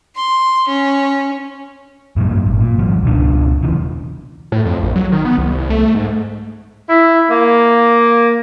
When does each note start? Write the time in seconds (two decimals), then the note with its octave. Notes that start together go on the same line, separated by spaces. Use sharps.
0.16 C6
0.68 C#4
2.16 G2 A#2 C#3 F#3
2.46 G#1
2.61 A#2
2.79 G#1 F3 G3
3.04 C#2 B2 A3 D4
3.63 E1 B1 C#3 E3
4.52 A2
4.65 F2
4.83 A#1
4.96 F#3
5.12 D#3
5.25 B3
5.38 C2
5.58 C2
5.70 A3
5.95 G#2
6.89 E4
7.31 A#3